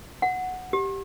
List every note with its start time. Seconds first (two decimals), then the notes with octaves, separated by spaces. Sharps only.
0.22 F#5
0.73 G4